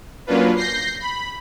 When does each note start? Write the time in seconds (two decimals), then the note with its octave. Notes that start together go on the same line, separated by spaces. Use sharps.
0.27 F#3 A#3 C#4 D4 F4 B4
0.56 G6 A#6 C7
1.00 B5